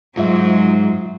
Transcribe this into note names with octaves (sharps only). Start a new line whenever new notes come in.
G#2 F#3 G#3 F4 E5